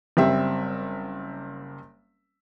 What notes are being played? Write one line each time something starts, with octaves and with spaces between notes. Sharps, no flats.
F#1 G3 C4 E5